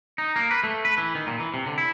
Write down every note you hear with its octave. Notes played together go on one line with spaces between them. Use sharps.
D#4
A#3
B4
A3
B4
E3
D#3
A#2
E3
C3
D3
E4